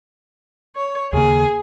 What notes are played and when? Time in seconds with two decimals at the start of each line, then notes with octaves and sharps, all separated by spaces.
0.76 C#5
1.13 D#2 C#3 A#3 G#4